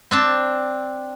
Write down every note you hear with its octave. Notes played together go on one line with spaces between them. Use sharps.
C4 D4 A5